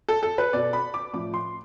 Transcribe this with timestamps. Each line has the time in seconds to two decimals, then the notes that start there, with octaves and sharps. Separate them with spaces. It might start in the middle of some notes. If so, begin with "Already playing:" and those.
0.08 A4
0.23 A4
0.38 B4
0.53 B2 D5
0.73 B5
0.94 D6
1.13 A2 F3 D6
1.34 C6